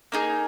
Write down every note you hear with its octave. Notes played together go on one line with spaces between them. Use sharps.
A#3 D#4 G#4